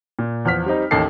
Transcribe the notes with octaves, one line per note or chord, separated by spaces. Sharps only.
A#2
E2 F3 F6 B6
G3 C4 D#4
A1 D#2 D#4 A4 A5 C7